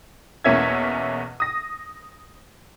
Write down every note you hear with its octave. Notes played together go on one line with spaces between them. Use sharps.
E2 B2 A#3 C#4 E5 G#6
D#6 A#6